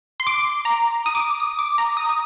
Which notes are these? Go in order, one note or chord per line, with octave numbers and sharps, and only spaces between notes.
C6
D6
A#5
D#6
D6
D#6
D6
A#5
D#6